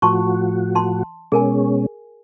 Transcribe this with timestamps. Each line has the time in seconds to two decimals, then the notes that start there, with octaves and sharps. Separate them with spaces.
0.02 A2 F3 F#4 A5 C6 C#6
0.75 A5 C6
1.32 B2 G#3 C#4 G#4 A#4 G#5